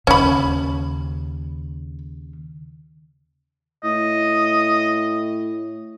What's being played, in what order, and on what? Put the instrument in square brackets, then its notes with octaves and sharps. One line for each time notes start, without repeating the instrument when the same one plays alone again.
[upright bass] D#2 C#3 [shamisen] C#4 B5
[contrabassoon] A2 [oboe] D#5